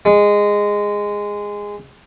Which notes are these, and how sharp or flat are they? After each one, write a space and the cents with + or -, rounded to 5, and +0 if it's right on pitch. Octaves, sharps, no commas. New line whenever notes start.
G#3 -15